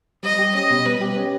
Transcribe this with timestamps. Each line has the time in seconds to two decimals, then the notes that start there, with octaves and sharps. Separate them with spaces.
0.23 G3 D#5
0.39 G4
0.54 C#4 D#5
0.70 B2
0.85 G3 B4
1.01 G4
1.16 C#4